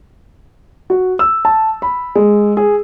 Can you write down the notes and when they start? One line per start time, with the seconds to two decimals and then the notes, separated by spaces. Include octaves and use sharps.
0.90 F#4
1.19 E6
1.45 A5
1.82 B5
2.15 G#3
2.57 G#4